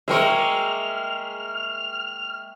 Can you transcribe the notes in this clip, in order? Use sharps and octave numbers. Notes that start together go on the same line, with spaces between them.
G#3 A#3 A#4 E5 G5 C#6 F6